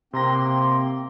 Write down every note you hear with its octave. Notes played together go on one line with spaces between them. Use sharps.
C3 A#3 C4 A#5 C6 A#6